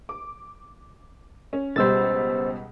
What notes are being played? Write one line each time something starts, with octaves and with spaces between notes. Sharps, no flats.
D6
C#4
C#2 B2 G3 C5 E6 A6